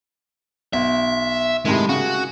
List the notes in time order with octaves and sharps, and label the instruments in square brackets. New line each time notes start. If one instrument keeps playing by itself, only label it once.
[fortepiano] B1 [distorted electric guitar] E5
[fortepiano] A2 C3 D#3 [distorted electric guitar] G#3
[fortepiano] C#3 [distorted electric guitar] F#4